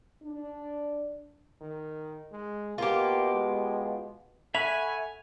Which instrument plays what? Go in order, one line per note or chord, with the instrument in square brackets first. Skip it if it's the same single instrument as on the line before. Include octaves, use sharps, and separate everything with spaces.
[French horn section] D4
[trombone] D#3
G#3
[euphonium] B2 [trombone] A#3 [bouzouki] F4 G4
[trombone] G#3
[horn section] A4 F#5 G#5 [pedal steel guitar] E5 B5 C#6 [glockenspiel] F7